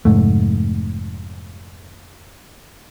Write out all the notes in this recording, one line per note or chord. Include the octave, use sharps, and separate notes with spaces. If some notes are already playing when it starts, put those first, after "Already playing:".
F1 G#2 A3